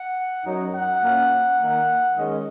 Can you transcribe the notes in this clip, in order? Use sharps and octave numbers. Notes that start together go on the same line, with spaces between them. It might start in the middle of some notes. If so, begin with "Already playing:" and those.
Already playing: F#5
F#2 F#3 D#4
F#5
A#2 A#3 C#4
D#3 A#3 D#4
D#3 G#3 C#4 D#5